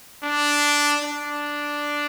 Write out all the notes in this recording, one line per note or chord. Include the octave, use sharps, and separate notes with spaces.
D4
D4